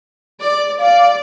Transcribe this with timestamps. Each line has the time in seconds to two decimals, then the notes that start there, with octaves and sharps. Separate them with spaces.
0.41 D5
0.79 D5 F5